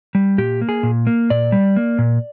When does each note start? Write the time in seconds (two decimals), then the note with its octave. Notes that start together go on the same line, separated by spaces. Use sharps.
0.15 G3
0.38 A#2 G4
0.61 A#3
0.69 G#4
0.83 A#2
1.07 A#3
1.30 A#2 D5
1.52 G3
1.76 A#3
1.99 A#2